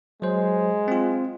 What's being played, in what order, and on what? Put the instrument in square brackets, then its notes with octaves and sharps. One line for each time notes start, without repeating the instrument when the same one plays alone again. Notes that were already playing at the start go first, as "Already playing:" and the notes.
[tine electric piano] F#3 C5 [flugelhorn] G#3
[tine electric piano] C4 F4